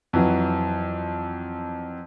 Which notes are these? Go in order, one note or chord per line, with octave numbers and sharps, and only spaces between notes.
F2 E3 F#3